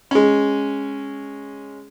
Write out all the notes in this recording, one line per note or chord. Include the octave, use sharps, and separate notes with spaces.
G#3 C#4